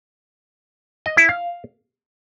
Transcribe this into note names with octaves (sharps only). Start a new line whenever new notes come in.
D#5
E4
F5